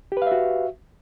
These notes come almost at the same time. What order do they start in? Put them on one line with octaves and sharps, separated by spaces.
G4 B4 F5 E5 F#4